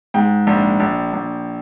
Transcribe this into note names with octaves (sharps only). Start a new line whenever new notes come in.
G#2 G5
A#1
A#1
A#1